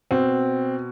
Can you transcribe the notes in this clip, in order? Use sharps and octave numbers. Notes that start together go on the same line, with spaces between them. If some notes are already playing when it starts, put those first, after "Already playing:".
B2 C4